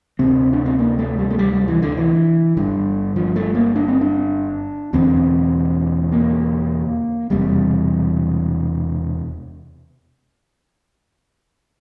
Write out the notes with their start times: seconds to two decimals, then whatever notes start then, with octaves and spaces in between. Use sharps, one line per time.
0.19 D2 C3 C4
0.53 D4
0.66 C4
0.79 A#3
0.99 A3
1.19 G3
1.30 A3
1.39 G3
1.53 G3
1.68 E3
1.82 D3
1.97 E3
2.57 G1 G2 D3
3.16 F3
3.36 A3
3.55 A#3
3.76 D4
3.88 C4
4.01 D4
4.93 E1 E2 D3 C4
6.12 A#3
7.30 E1 E2 C3 G3